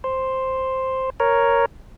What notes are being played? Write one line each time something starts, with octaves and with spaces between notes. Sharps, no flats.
C5
A#4 C#5